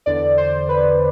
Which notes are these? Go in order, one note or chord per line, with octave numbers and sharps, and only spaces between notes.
E2 D3 D5
C5
B4